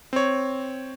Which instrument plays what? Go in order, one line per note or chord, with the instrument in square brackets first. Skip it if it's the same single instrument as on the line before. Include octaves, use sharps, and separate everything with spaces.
[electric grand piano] C4 C#5